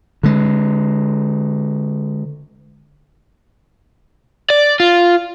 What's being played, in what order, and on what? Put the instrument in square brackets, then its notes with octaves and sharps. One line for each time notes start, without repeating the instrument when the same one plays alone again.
[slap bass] D3 G#3
[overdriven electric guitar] D5
F4